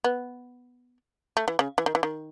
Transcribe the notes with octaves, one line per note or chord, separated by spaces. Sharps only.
B3
A3
E3
C#3
E3
D#3
E3
D#3